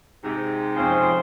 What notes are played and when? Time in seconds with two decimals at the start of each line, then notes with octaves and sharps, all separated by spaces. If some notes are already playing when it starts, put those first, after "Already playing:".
0.24 G#2 C3
0.75 F2 C4 C#4 F4 G#4 C5